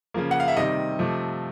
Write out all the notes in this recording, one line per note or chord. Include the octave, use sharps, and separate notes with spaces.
C#3 F3 A#3
F#5
F5
E5
C3 D#3 G3 C4 D#5
C3 F3 A3